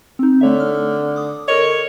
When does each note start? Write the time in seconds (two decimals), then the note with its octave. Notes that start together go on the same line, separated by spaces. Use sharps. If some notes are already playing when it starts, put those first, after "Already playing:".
0.19 C4 D#4
0.41 D3 A3 C#5 E5
0.60 F6
1.16 D6 D#6
1.48 A4 A#4 C#5 D#5